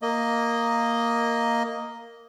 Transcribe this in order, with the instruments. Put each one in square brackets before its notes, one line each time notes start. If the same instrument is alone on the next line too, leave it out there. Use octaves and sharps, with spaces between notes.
[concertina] A#3 D#5